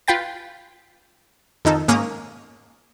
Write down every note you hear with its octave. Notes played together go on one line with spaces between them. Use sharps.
F4 B4 G5 A6
F2 D#3 D#4 A4
G#2 A#3 C#4 A#5 D#6